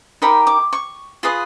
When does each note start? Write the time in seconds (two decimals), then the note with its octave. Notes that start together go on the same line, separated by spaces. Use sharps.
0.22 D#4 G4 A#4 B5
0.47 D6
0.73 C#6
1.23 F4 G#4 B4 D#5